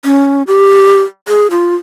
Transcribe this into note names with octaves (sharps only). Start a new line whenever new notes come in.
C#4
G4
G#4
F4